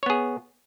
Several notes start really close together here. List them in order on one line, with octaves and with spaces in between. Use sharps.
C#5 B3 G#4